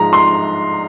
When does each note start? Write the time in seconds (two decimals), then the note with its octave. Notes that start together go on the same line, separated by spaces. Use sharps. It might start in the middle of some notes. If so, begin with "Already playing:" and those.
Already playing: G#2 F3 G#3 A#5
0.13 C6